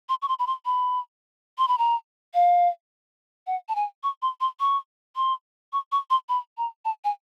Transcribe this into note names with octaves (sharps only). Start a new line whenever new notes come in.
C6
C#6
C6
B5
C6
B5
C6
B5
A#5
F5
F#5
A5
G#5
C#6
C6
C6
C#6
C6
C#6
C#6
C6
B5
A#5
A5
G#5